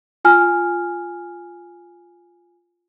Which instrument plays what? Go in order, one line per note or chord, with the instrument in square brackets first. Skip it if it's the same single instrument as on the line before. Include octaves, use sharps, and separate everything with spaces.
[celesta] F4 G#5 F6